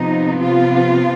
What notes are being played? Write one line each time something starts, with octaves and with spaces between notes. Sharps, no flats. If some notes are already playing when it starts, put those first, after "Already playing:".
Already playing: C3 F3 B3 D#4
F4